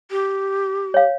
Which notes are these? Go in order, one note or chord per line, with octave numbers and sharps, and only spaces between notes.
G4
C#5 F5